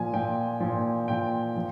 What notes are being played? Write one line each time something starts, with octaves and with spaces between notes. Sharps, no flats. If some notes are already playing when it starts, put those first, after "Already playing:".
Already playing: A#2 F3 G#5
A#2 F3 G5
A#2 F3
A#2 F3 G5
F3